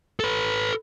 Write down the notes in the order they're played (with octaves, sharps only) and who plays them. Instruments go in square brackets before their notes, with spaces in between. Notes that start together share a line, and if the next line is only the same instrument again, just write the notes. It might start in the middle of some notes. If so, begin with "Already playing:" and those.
[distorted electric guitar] A4 B4